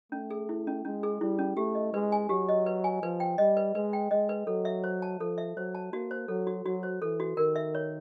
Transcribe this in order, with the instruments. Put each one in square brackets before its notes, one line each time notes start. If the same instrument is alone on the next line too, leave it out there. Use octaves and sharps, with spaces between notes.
[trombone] A3 [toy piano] C#4
[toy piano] G#4
E4
C#4
[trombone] G#3 [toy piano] C#4
[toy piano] G#4
[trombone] G3 [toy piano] E4
[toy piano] C#4
[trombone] A3 [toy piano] G4
[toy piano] D#5
[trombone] G#3 [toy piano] B4
[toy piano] G#5
[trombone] F#3 [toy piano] G4
[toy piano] D#5
B4
G#5
[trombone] F3 [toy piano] B4
[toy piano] G5
[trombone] G3 [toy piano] D#5
[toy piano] B4
[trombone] G#3 [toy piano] B4
[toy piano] G5
[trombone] G#3 [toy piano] D#5
[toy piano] B4
[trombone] F#3 [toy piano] A4
[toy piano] E5
C5
A5
[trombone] F3 [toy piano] A4
[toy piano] E5
[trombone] F#3 [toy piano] C5
[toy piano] A5
[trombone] A#3 [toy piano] F#4
[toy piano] C5
[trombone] F#3 [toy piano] A4
[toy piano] F#4
[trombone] F#3 [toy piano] F#4
[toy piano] C5
[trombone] E3 [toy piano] A4
[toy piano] F#4
[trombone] D#3 [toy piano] A#4
[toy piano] E5
C#5